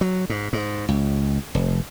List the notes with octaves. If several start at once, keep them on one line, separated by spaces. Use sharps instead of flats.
F#3
G#2
G#2
C#2
F1